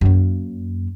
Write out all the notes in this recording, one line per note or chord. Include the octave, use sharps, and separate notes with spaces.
F#2 A#3